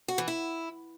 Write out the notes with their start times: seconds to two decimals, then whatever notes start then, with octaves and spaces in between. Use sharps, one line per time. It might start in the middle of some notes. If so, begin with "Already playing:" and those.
0.08 F#4
0.18 E3
0.28 E4